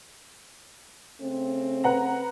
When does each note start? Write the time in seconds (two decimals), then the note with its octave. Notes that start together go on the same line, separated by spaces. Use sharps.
1.21 C#3 A3 C4
1.84 B4 F#5 A#5